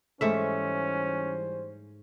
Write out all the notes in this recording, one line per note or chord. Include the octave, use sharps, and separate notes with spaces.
G#2 E3 G3 A3 C#4 C5 E5